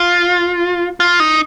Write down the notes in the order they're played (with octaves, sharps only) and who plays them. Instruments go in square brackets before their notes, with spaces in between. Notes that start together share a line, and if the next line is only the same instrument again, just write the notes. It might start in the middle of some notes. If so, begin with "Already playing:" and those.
Already playing: [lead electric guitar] F4
F4
D#4